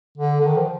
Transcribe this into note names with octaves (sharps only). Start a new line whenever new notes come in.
D3
D3
D#3
F3